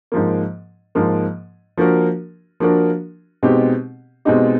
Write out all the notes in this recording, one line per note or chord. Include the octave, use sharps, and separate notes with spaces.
G#2 F3 A#3
G#2 F3 A#3
F3 A#3 D4 F#4 A#4
F3 A#3 D4 F#4 A#4
B2 G#3 C4 D#4 G4
B2 G#3 C4 D#4 G4